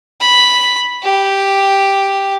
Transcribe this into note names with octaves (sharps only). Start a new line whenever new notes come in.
B5
G4